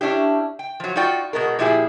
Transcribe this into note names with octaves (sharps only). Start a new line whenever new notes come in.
C#4 D4 E4 G4
G5
F3 F#3
D#4 F4 F#4 D5 G5
B2 G#3 B3 A#4
A#2 F3 E4 G4 G#4